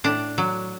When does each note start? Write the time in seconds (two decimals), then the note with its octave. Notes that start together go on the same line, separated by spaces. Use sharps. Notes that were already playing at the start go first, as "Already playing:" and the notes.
0.04 A2 D4
0.38 F#3